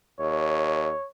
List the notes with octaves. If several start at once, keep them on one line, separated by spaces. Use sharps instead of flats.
D#2 C#5